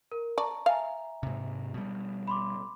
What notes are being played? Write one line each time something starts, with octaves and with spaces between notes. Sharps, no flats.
A#4
D5 A5 A#5 C#6
E5 F5 G#5 A#5
G#2 C3
B2 G3
B5 C6 D6